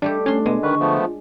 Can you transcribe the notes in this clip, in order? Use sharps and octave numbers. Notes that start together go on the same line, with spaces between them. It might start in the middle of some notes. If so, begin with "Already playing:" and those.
G3 A3 D4 G4
A3 C#4 D4 C6
B2 G#3
D3 D#3 B4 C#6
F3 A3 B3
F4